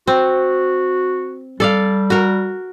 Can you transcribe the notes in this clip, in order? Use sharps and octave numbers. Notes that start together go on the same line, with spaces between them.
C4 F#4
G3 A4 D5 F5
F#4 A#4